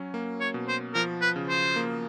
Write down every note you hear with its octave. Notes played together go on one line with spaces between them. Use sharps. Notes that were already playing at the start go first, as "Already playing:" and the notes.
Already playing: F#3 C#4
A#3
C#5
B2
C5
F3 A#4
B4
C#3
C5
A#3